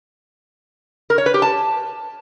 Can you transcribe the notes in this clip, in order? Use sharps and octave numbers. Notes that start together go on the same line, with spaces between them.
A#4
C#5
B4
G4
A5